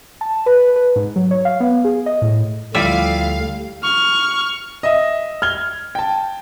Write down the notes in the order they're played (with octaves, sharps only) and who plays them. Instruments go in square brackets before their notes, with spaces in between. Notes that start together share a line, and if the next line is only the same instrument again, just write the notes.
[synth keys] A5
B4
B4
G#2
F#3
C#5
F5
B3
G#4
D#5
A2
[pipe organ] D2 D3 [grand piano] F3 E4 F4 [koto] G3 E5 [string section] F5
[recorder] C#6 [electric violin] F6
[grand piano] D#5 E5
F6 G#6 G7
G5 A5